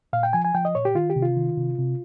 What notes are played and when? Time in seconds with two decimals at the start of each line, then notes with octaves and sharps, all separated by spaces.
0.13 A#2 F5
0.23 G5
0.33 F3 G#5
0.45 G#5
0.54 F3 G5
0.65 D#5
0.75 A#2 C#5
0.85 G4
0.95 D#3 F4
1.10 G4
1.16 C3
1.22 F4
1.37 D#3
1.57 C3
1.78 C3